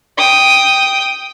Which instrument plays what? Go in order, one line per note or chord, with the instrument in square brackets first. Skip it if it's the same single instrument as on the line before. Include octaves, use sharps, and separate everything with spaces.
[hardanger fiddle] G5 D#6